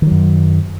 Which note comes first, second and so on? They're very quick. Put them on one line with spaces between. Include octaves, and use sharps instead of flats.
D#3 F#3 F#2